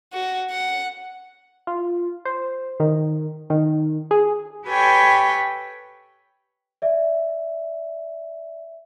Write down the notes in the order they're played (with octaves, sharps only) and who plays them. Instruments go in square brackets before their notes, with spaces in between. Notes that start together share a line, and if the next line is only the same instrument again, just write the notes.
[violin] F#4
F#5
[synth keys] F4
C5
D#3
D#3
G#4
[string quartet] G4 A4 B4 C#5 G5 G#5
[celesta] D5 E5